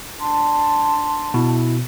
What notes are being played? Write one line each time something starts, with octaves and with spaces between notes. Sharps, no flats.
D4 A5 C6
B2 E4